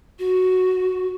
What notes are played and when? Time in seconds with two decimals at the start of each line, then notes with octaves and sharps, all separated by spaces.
0.19 F#4